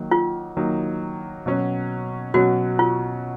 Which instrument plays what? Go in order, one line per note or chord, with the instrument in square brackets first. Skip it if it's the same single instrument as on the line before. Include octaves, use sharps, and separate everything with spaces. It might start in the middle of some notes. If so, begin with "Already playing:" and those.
Already playing: [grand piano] D#3 F#3 A#3 D#4
[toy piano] F4
[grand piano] D#3 F#3 A#3 D#4
B2 F#3 C#4
[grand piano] B2 F#3 C#4 [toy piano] F#4
[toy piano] F4